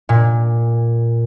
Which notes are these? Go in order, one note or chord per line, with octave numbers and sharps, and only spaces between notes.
A#2